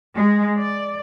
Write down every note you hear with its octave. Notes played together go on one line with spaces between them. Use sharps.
G#3
D5